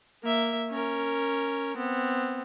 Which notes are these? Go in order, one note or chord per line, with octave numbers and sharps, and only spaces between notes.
A#3 E5
C#4 A#4
B3 C4